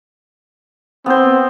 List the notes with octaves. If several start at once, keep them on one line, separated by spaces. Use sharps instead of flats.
B3 C4 C5